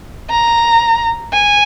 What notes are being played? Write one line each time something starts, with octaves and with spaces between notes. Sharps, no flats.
A#5
G#5